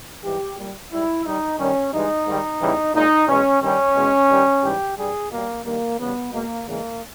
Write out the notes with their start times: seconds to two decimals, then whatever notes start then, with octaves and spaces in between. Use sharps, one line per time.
0.24 G#2 E3 G3 G4
0.58 A#2 G3
0.91 G#2 G3 E4
1.25 G2 G3 D#4
1.59 G2 D#3 G3 C#4
1.93 G2 E3 G#3 D#4
2.26 G#2 D#3 G3
2.60 E2 C#3 E3 G3
2.94 A#2 G#3 D#4
3.28 E2 B2 G#3 C#4
3.62 G2 D#3 G3 C#4
3.95 E2 B2 G#3
4.29 G2 D#3 G3
4.62 G#2 E3 G3 G4
4.97 G2 G3 G#4
5.30 B2 G3 A#3
5.64 G2 D#3 G3 A#3
5.98 E2 C#3 G3 B3
6.32 B2 G#3 A#3
6.66 E2 C#3 E3 G#3 A#3